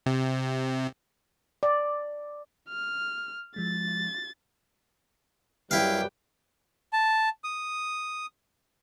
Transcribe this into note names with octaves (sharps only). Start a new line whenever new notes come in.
C3
D5
F6
F3 G#3 A6
F#2 G3 E4 G4 B4 F5 G5
A5
D#6